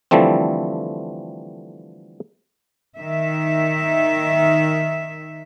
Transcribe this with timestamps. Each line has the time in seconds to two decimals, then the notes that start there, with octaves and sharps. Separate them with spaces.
0.11 D3 E3 F3 G3 A3 C4
2.96 D#3 E5